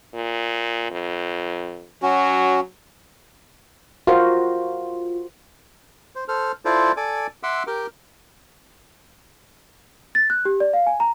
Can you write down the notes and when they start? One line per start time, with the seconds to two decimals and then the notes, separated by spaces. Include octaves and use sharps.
0.14 A#2
0.91 F2
2.03 F#3 C#4 F#4
4.07 F4 F#4 A#4 C5
6.15 C5
6.28 A4 C5 F6
6.65 E4 F4 A4 C5 D5
6.97 A4 D5 G#5 D6
7.43 E5 F#5 C6 D6 E6
7.67 G4 A#4 G5 D6
10.15 A6
10.30 F#6
10.45 G4
10.60 D5
10.73 F5
10.87 G#5
11.00 A#5